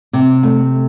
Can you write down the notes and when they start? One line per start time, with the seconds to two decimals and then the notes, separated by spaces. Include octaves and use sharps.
0.13 C3
0.43 A3